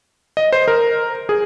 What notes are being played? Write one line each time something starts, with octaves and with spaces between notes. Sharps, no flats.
D#5
C5
A#4
G#4